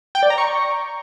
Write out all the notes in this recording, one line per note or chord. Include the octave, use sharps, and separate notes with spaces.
G5
D5
A#5
C#6